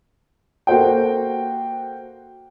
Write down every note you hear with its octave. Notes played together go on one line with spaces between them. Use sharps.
A#3 F#4 A4 C5 F#5 G5